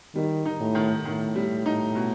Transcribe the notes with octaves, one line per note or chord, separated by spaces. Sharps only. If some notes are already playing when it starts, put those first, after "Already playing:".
D#3 G3
D#4
A2
D#3
A2 D#3
G3
D#4
B2